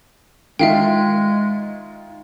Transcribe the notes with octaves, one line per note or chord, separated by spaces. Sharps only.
D#3 G#3 F4 E5 F5 G5